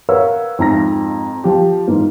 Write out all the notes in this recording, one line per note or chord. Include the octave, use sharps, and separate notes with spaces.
A#4 B4 C#5 F5 F#5 E6
F2 G#2 A#5 A#6
F3 G4
G#2 E3 A#3